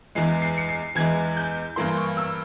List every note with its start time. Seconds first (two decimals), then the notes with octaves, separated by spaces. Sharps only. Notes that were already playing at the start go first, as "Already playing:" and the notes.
0.15 E2 E3 G#3 C7
0.42 C7
0.58 C#7
0.69 C7
0.95 E2 E3 G#3 G#6
1.37 G6
1.76 G2 E3 A#3 C6
1.97 C#6
2.17 E6